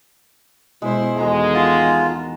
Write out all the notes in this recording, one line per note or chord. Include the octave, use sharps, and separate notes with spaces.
B2 G#3 E4 C5
E2 D#3 G#3 F#4 A4 A#5
F4 F#4 A5 A#5